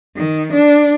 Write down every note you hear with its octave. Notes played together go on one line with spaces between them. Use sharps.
D#3
D4